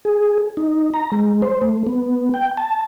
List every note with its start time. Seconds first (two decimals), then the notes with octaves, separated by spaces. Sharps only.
0.05 G#4
0.57 D#4
0.94 A#5
1.12 G#3
1.42 C5
1.62 A3
1.87 B3
2.34 G5
2.57 A5